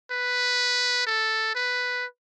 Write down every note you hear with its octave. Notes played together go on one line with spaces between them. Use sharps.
B4
A4
B4